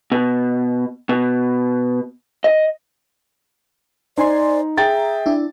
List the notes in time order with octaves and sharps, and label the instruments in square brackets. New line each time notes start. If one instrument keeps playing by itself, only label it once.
[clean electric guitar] B2
B2
D#5
[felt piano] D#4 [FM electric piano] C5 G#5 C6 [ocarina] D5
[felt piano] G#4 G5 A6 [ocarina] E5 [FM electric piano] A#5
[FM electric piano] D4 E4